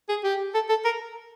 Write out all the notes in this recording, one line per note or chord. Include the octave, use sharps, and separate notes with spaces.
G#4
G4
A4
A4
A#4